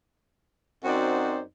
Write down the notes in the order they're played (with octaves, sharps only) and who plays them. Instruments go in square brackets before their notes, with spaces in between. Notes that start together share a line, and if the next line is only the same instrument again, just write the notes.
[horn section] F#2 C4 D#4 F#4 C5 D5